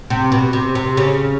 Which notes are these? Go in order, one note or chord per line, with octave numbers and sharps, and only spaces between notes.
C3
B2
C3
C3
C#3